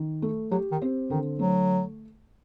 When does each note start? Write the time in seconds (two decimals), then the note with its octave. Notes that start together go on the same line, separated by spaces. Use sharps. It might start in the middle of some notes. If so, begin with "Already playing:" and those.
Already playing: D#3
0.22 A3
0.51 F#3 G4
0.72 D#3
0.82 C4
1.10 D3 D#3
1.39 F#3 A3